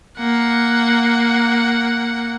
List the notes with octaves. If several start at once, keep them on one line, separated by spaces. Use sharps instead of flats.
A#3 F#5